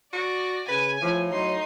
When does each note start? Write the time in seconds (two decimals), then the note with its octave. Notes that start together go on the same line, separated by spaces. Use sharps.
0.13 F#4 D5 A#6
0.68 C#3 B4 G#5
1.01 A2 F3
1.31 F#3 D#4 C6